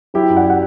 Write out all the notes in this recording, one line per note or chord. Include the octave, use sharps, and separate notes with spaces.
F#3 E4 G4
F#2
D5 F#5
F#5